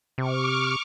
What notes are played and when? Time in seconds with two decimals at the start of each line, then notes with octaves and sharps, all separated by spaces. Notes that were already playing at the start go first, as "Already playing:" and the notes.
0.18 C3 C#6 D6 F6